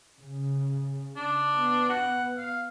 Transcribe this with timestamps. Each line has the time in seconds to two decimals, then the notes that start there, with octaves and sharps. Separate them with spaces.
0.19 C#3
1.16 D4
1.54 B3
1.89 F#5
2.37 F5